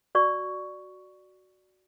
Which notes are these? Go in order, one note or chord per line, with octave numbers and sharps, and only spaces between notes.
F#4 D5 C#6